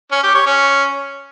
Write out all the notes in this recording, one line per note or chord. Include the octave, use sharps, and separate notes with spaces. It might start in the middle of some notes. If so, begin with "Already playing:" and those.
C#4
G4
C#5
C#4